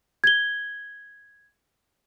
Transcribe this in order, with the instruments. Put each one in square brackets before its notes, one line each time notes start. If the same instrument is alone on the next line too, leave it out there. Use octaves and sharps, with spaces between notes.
[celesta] G#6 G7